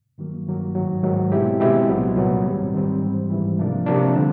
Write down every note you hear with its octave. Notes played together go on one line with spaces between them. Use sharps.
G2 D#3 F#3 A#3
G2 D#3 F#3 A#3
G#2 D#3 F#3
G#2 D#3 F#3
B2 G#3 C4 E4 G4
B2 G#3 C4 E4 G4
C2 A#2 F#3 B3
C2 A#2 F#3 B3
G#2 D#3 G3 C4
G#2 D#3 G3 C4
G#2 E3 G3
G#2 E3 G3
C3 F3 A#3 D4
C3 F3 A#3 D4
D3 G3 C4